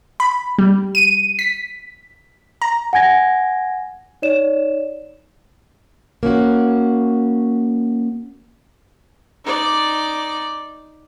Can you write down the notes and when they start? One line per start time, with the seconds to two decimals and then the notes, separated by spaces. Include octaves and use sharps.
0.20 B5
0.58 G3
0.95 D#7
1.39 B6
2.62 A#5
2.93 F#5 G#5 G#6 A#6
4.22 D#4 C#5 D5 E7
6.23 A#3 C#4 F#4
9.45 D#4 D5